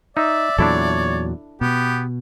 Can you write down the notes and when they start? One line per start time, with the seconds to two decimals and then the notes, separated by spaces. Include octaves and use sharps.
0.17 D#4 D5 E5
0.58 E2 A#2 F#3 D4 E4 A4 C#5
1.61 B2 B3 G4